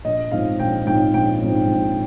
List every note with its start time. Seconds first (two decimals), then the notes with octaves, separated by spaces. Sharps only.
0.05 A#1 D#5
0.31 G#2 F3 C4 F5
0.60 A#1 G5
0.86 G#2 F3 C4 G5
1.13 A#1 G5
1.41 G#2 F3 C4
1.68 A#1